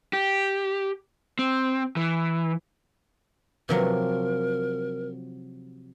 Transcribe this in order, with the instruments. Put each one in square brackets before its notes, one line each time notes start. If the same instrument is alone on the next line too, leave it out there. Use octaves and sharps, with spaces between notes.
[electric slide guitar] G4
C4
E3
[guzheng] C3 F3 F#3 [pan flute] A#4